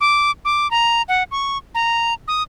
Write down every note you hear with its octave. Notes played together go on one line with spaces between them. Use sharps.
D6
D6
A#5
F#5
C#6
A#5
D#6